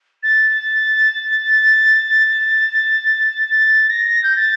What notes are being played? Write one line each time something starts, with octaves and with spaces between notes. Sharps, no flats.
A6
A#6
G6
A6